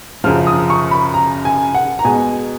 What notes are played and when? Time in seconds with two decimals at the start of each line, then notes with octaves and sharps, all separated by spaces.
0.24 F#2 C#3 F3 F6
0.47 D#6
0.70 C#6
0.91 B5
1.14 A#5
1.45 G#5
1.75 F#5
1.99 A#5
2.04 B2 G#3 G#5